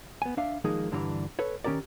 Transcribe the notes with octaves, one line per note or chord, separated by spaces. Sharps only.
B3 G#5
D4 E5 F5
D#3 F3 G#3 A#3 D#4 G#4
G2 D3 E3 D4 A#5
A4 B4 C#5
D#3 C#4 G4 A#4 D5